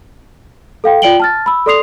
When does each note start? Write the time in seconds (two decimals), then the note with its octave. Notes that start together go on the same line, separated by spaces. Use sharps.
0.84 A4 F5 G5
1.02 F4 D5 G5 D7 F#7 G7
1.20 A5 F6 A6
1.46 B5 E6
1.66 A4 D5 C6 D#6 C7 F7